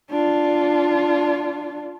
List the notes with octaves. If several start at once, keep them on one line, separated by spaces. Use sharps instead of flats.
D4 F4